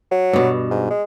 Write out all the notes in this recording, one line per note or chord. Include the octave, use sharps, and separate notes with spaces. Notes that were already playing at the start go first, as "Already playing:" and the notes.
F#3
G2 B2
G#2
G#3